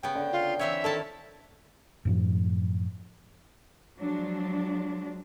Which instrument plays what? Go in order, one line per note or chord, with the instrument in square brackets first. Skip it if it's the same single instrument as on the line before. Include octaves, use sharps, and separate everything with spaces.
[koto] C#3 B3 [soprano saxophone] G5
[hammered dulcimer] D3
[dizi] F4
[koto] E3 C4 C#5 [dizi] E5
[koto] D#3 E4 A5 [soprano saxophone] A4
[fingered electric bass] F#2 A2 F3
[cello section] F3 F#3 G#3 D4